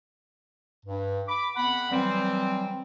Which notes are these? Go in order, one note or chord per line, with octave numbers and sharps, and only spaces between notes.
G2
B5 D6
F2 B3 F#5 B5
E3 F#3 G3 C4